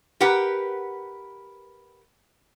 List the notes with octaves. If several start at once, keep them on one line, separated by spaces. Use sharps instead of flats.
G4 A#4 B4 F#5